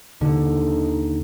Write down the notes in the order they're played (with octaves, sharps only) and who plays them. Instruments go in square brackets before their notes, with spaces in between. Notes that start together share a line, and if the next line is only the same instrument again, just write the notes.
[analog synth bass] D#2 [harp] D3 [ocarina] D#4